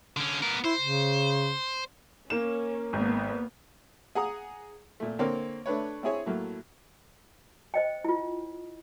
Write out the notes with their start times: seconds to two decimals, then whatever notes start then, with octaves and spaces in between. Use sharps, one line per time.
0.17 D3 C#4
0.42 B3 A#4
0.64 E4 C5
0.80 C#3
2.30 A#3 C#4 E7
2.93 G#1 A#3 B3
4.15 G#4 F#5 A#5 D#6
5.00 A#2 A3
5.19 D3 A#3 C4 A#4 C#5
5.66 A3 D4 B4 C#5
6.03 C4 E4 G#4 C#5 E5
6.26 A2 F#3 A3 A#3
7.74 C5 D#5 G5
8.04 E4 F4